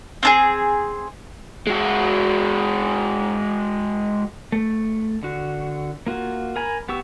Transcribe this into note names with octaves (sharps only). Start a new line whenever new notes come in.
C4 D4 G#4
G#3 F#4
A3
D3 F#4
A#3 F4 F#4
A#4 G#5 A#5 B5
B3 G4 C#6 E6